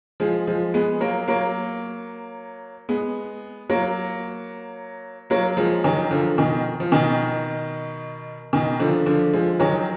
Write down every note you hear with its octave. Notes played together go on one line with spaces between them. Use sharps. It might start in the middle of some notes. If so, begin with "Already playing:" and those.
F3 G#3
F3 G#3
G#3 B3
F#3 A#3
F#3 A#3
G#3 B3
F#3 A#3
F#3 A#3
F3 G#3
D#3 F#3
D3 F3
B2 D#3
F3
B2 D#3
B2 D#3
D3 F3
D3 F3
F3 G#3
D#3 F#3